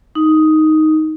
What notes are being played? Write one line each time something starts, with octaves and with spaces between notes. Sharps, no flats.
D#4